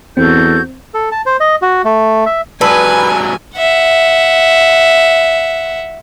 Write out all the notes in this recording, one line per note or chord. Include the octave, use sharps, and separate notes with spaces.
E2 C4 F#4 A4 G6
A4
A5
C5
D#5
F#4
A3
E5
G#2 F#3 B4 D5 G#5 A5 E6
E5 F#5